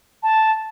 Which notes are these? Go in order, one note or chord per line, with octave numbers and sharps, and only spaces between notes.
A5